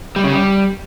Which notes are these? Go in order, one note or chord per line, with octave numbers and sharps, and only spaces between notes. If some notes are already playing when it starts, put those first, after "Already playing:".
G3
C#3
G3